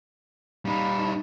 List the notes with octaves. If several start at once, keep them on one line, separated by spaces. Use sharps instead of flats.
G3 D#4 F5 A5 B5